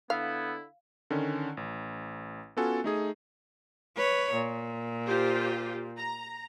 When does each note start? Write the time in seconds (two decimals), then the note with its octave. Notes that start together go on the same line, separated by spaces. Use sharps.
0.10 D3 B3 E4 F5
1.10 D3 D#3 C#4
1.57 A1
2.57 B3 C#4 F4 F#4 A4 G#5
2.84 A3 D#4 G#4
3.97 B4 C#5
4.34 A#2
5.06 F4 G4 C5
5.97 A#5